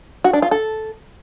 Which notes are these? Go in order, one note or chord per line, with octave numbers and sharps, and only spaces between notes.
F#4
D4
F4
A4